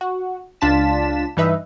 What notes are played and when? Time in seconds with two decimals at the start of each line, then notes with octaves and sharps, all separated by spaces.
0.01 F#4
0.61 C#2 D4 F4 A5 B6 E7
1.37 G2 E3 D#4 B4 E5